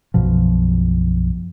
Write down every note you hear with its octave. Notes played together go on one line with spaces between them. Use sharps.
B1 F#2 B2 F3